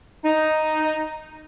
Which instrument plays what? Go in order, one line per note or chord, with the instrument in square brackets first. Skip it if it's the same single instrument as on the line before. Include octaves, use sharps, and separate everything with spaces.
[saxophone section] D#4